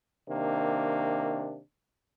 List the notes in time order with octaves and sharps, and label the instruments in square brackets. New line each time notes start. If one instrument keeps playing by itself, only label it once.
[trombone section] C3 D#3 A#3 D4